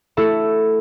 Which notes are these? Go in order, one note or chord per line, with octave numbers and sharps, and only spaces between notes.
A3 E4 F#4 A4